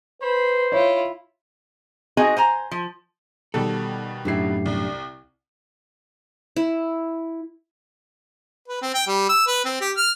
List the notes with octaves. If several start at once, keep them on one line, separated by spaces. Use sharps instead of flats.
B4 C5 B5
E4 F4 C#5
C4 D#4 F#4 G#4 D#5 G#5
C5 G#5 A#5
F3
B2 D#3 G3 A4
F#2 A2 D4 E4 G4 C7
C2
E4
B4
C4
G5
G3
E6
B4
C4
G4
F6